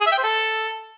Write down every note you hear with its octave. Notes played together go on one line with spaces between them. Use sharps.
G#4
E5
G5
C5
A4